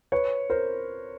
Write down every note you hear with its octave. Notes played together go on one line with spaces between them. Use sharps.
B4 C#5
A#4 C5